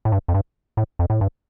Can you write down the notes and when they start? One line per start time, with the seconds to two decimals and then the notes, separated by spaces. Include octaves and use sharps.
0.05 A2
0.12 G2
0.28 F2
0.34 G2
0.77 A2
0.99 F2
1.10 A2
1.21 G2